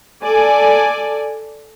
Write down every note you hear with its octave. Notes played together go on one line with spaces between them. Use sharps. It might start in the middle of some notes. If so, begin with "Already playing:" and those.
A4 D5 G#5